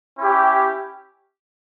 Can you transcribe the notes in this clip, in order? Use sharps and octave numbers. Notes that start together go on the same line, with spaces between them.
C#4 E4 G4